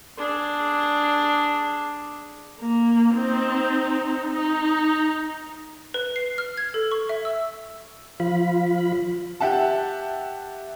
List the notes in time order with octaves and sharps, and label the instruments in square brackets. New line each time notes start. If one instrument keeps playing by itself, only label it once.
[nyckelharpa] D4 G#4
[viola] A#3
C4 D#4
D#4
[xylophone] B4
C7
F6
G#6
A4
C#6
E5
E6
[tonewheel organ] F3 F4 B5
[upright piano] G4 E5 F#5 A5